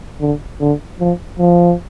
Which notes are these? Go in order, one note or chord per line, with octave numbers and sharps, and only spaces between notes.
D3
D3
F3
F3